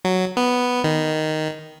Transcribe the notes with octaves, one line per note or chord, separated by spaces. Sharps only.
F#3
B3
D#3